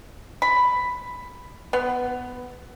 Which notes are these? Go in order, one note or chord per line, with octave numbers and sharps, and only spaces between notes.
B5
B3